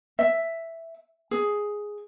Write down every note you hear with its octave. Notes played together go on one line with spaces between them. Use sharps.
E5
G#4